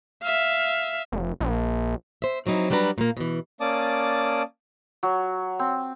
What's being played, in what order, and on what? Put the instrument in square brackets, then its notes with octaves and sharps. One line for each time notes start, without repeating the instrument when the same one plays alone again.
[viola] E5 F5
[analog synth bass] F1
A#1
[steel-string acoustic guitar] C5 E5
F3 F#3 C4 D#4 E4
F#3 G3 D4 F#4 B4 A#5
A#2 A#3
B2 E3
[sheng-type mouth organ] A#3 C#4 D5 A5 D6 D#6
[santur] F#3
C4